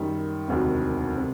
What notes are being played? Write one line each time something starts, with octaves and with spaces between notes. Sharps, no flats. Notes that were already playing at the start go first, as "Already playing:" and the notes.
Already playing: F#2 D#3 G3
E1 D2 C3 D#3 F#3
C3